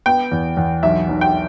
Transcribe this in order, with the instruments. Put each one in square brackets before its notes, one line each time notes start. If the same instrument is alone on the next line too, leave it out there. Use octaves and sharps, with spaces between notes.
[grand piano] B3 [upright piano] G5
[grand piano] E2
E2
[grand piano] B1 [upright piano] E5
[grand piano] B1
[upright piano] G5